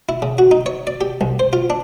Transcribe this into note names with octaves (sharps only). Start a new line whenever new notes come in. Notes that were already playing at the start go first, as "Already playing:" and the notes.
E4
C#3
F#4
D#4
C#5
D5
G4
C2
C5
F4
D4